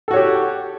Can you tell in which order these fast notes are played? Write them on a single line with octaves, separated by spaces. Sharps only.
A4 F#4 C#5 G4